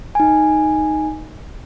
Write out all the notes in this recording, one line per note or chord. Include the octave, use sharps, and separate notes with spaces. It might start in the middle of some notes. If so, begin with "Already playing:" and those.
D#4 G#5